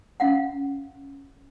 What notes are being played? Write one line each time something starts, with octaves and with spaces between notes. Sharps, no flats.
C#4 F5 F#5